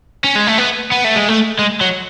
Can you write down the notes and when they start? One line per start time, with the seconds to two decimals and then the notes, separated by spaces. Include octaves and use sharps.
0.24 C#4
0.36 G#3
0.47 A3
0.58 B3
0.91 B3
1.04 A3
1.16 G#3
1.29 A3
1.59 G#3
1.81 F#3